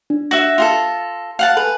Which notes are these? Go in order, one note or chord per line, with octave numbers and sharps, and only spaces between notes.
D4
F#4 E5 A#6
F4 G#4 A4
F5 F#5 A5
A4 B4 G#5